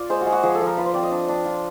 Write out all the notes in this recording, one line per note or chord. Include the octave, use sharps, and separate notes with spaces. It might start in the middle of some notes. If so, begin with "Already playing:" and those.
Already playing: F4 D5
G#3 C5
F#4
G#3
F#4
F3 G#4
A4
F3
A#4
F4 B4
C5
C4 D5
D#5
D4
D4
F4